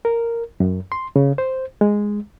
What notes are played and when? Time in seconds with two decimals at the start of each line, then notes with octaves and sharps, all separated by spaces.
0.05 A#4
0.60 F#2
0.92 C6
1.16 C#3
1.38 C5
1.81 G#3